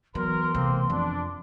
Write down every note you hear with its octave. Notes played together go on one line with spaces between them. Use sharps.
E2 F#3 A#4 C6
C3 A3 A#3 C4
F2 D4